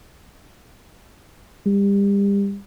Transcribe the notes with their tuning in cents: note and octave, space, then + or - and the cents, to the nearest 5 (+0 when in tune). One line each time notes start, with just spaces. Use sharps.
G3 +30